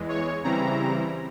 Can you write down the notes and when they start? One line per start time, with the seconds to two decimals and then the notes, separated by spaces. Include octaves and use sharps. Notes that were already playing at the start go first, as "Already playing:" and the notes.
Already playing: E2 E3 G#3
0.09 C#5
0.43 C#3 E3 G3 C4 E4 A#5